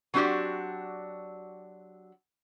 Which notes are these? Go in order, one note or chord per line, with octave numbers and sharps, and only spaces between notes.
F#3 C4 D4 F#4 G4 D5